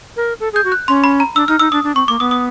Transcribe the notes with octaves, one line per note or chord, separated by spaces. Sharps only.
A#4
A4
G#4 G6
F#4
F#6
C#4 C6
B5
A#5
D4 E6
D#4 F6
D#4 E6
D4 D#6
D4
C4 C#6
A#3 D6
B3 D#6
D#6